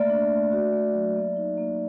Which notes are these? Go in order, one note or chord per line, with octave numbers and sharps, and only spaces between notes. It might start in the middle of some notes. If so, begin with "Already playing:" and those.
Already playing: A3 A#3 D5 E5
D4
A3
F#4
A3
F#3
A#3
D#4
A#3